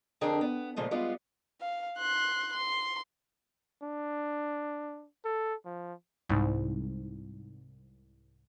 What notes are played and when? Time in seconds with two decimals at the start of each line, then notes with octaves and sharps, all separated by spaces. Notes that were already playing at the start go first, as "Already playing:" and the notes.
0.21 F2 D3 D4 G#4 A#4 G5
0.41 B3
0.76 A#2 C#3 F3 G#3 A3
0.91 G3 G#3 B3 F4
1.61 F5
1.98 C6 F#6
2.53 C6
3.82 D4
5.25 A4
5.65 F3
6.29 C2 G#2